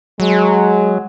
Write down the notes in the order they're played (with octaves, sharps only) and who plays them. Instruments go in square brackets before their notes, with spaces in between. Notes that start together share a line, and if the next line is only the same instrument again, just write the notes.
[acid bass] F#3 [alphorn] G#3